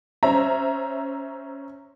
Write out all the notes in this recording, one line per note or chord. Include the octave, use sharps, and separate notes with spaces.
C#4 C5 E5 A#5